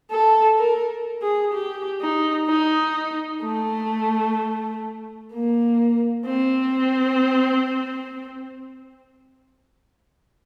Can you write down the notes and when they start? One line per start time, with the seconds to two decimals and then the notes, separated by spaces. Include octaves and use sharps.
0.11 A4
0.58 A#4
1.22 G#4
1.54 G4
2.01 D#4
2.48 D#4
3.43 A3
5.33 A#3
6.27 C4